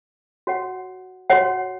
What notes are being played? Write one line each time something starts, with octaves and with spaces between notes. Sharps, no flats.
F#4 C#5 F#5
F#4 C#5 F#5